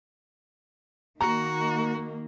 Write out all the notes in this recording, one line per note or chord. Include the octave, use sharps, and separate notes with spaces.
D#3 A#3 F#4 A#5